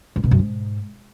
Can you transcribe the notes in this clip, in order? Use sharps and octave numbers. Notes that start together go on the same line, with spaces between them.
G#2
B2
F#2
G#2